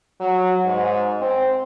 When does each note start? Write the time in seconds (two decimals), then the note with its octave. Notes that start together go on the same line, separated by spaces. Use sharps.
0.20 F#3
0.65 G#2
1.21 C4